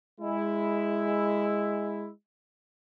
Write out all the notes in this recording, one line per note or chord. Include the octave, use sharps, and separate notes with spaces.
G#3 E4